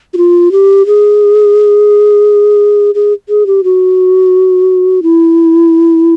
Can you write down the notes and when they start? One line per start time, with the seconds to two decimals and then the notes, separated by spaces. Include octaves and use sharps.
0.14 F#4
0.17 F4
0.52 G4
0.86 G#4
2.95 G#4
3.29 G#4
3.46 G4
3.64 F#4
5.03 E4